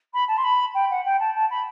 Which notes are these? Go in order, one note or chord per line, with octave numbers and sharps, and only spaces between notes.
B5
A5
C6
B5
G5
F#5
G5
A5
A5
B5